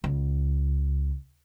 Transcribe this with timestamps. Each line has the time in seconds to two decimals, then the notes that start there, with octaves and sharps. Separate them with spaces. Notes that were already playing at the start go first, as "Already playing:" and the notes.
0.04 C#2